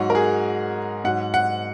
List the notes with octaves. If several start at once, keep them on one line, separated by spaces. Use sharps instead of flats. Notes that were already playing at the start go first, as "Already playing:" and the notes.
Already playing: G#2 F#3 F#4
A#4
G#4
G#2 F#3 F#5
F#5